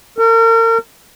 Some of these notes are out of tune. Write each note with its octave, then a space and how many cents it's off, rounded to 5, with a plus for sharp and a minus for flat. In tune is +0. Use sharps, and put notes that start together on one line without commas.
A#4 -40